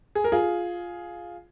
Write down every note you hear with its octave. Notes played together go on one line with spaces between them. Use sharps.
G#4
A#4
F4 G#4